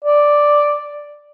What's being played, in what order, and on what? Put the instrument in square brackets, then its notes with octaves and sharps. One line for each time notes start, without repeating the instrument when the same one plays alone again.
[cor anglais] D5